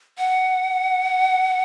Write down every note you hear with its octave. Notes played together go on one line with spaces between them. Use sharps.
F#5